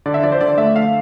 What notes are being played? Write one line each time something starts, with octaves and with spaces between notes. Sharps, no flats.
D3 D5
E5
F3 D5
C5
D3 D5
A3 E5
D3 F5